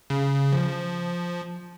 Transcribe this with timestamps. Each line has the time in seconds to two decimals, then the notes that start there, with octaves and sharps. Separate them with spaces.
0.10 C#3
0.52 F3